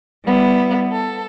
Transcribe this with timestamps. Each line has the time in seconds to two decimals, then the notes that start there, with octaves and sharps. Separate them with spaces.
0.23 G3 B3 E4
0.91 A4